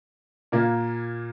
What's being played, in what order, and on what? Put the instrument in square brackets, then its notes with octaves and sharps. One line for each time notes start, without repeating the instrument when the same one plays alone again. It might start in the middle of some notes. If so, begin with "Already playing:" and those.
[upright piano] A#2 A#3